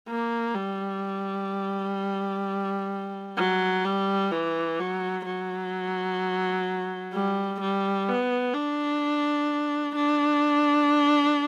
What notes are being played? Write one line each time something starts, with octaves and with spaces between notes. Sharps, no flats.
A#3
G3
F#3
G3
E3
F#3
F#3
G3
G3
B3
D4
D4